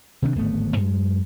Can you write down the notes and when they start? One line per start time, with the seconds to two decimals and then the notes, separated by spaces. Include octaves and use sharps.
0.22 C3 D#3 C4 D4
0.35 D1 G#1 A3 B3
0.77 F#2 G#3